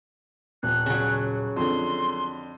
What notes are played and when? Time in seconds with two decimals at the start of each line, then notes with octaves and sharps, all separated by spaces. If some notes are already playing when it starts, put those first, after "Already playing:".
0.63 D#1 F#6
0.86 C#3 F#3
1.56 F2 D3 C6